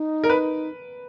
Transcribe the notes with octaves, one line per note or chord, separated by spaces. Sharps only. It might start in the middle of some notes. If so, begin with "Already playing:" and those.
Already playing: D#4
A#4
B4